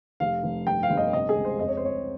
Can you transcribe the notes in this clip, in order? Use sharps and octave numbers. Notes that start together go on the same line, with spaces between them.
F1 F5
F1
G2 G5
F5
G1
D#5
C3 D#5
G#4
C#2
C5
F2 D#5
C#5
C5
F2 C#5